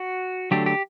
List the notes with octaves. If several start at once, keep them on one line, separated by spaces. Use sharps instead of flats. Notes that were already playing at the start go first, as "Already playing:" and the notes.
Already playing: F#4
D3 F#3 A3 D4 G4
G4